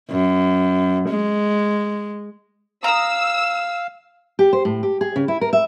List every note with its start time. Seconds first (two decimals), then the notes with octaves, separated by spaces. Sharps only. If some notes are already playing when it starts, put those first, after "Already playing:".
0.10 F#2
1.09 G#3
2.84 F5 A#5 D#6 E6
4.39 G4
4.53 C5
4.65 A2
4.83 G4
5.01 G#4
5.16 C#3
5.28 E4
5.41 A#4
5.53 E5